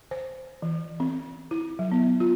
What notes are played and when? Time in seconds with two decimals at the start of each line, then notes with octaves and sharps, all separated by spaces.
0.11 C5
0.62 E3
1.00 C4
1.51 E4
1.79 F#3
1.92 B3
2.20 F4